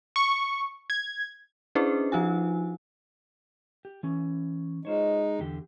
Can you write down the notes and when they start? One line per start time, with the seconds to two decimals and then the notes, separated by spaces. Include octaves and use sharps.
0.16 C#6
0.90 G#6
1.75 C#4 D4 E4 G#4 B4 C5
2.12 F3 D#4 F4 G#5
3.85 G4
4.03 E3 C#4
4.85 G#3 D#4 F4 C5 C#5
5.39 E2 D3 G4